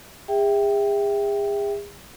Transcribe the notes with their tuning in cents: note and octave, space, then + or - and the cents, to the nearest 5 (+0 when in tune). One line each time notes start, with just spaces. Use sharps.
G#4 -40 E5 -5 G5 +0